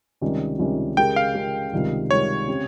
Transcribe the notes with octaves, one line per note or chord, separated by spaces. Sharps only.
C#2 C3 D#3 G3 C#4
C#2 C3 D#3 G3 C#4
C#3 G#3 C#4 G4 A#4 G5
F5
C#3 G#3 C#4 G4 A#4
C#2 C3 D#3 G3
C#2 C3 D#3 G3 C#5
C#3 G#3 C4 G4